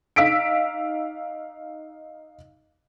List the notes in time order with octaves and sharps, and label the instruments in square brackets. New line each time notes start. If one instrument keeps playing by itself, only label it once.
[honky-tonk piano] D#4 F5 E6 B6 D7